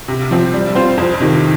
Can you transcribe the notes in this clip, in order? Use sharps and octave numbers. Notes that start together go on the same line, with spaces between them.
C3
F3 C4
G3
C4 F4 C5
F2
C3 D#3